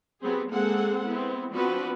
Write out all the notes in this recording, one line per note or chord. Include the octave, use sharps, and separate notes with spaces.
F#3 B3 C4 G4 G#4
G#3 A#3 C4 G#4 A4 F#5
B3 C4 E4
F3 B3 C4 D4 F#4 B4